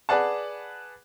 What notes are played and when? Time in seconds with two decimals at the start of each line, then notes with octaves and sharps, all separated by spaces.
0.09 G#4 B4 D5 F#5 A5